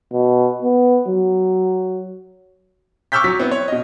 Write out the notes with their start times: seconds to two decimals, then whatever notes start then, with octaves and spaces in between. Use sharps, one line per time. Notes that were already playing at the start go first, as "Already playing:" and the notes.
0.12 B2
0.62 B3
1.08 F#3
3.12 C#6 D6 E6 F6 G6 B6
3.24 F#3 B6
3.39 B3 C4 E4
3.51 C#5
3.68 B2 D#5